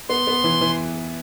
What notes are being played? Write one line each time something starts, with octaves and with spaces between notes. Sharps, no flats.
B3 C6
B3
E3
E3